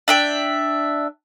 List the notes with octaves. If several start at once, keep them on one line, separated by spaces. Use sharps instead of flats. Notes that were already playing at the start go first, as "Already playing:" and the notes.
D4 E5 G5